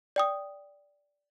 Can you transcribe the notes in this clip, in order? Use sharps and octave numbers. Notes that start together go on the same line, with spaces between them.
D5 G5 D#6